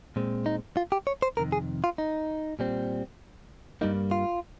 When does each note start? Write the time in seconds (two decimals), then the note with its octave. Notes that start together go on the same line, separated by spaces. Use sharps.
0.16 A#2 G#3 C4
0.46 D#4
0.77 F4
0.92 G4
1.07 C#5
1.22 C5
1.37 F2 C3 D#3 A#4
1.52 G#4
1.84 F4
1.98 D#4
2.59 A#2 G3 C4
3.81 G2 G3 A#3 D#4
4.11 F4